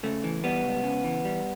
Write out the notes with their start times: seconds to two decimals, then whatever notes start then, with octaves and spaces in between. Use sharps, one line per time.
0.03 C#3 A3
0.24 E3
0.44 G3 B3
0.64 C#2
0.84 C#3
1.04 E3
1.25 G3